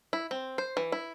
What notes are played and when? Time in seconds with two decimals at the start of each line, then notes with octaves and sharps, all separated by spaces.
0.13 E4
0.31 C4
0.58 C5
0.77 E3
0.92 E4